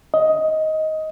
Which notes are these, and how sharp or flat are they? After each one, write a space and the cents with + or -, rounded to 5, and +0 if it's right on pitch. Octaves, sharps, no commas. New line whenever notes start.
D#5 +15